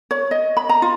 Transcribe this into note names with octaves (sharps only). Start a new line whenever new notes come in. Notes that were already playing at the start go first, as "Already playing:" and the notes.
C#5
D#5
B5
A#5
F4